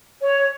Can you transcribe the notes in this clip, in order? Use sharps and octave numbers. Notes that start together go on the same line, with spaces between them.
C#5